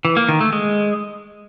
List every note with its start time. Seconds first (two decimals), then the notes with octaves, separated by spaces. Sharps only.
0.05 E3
0.17 A#3
0.29 D#3
0.41 A3
0.53 G#3